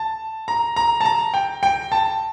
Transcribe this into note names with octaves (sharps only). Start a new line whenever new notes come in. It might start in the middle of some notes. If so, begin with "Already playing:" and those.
Already playing: A5
A#5
A#5
A5
A#5
G5
G5
A5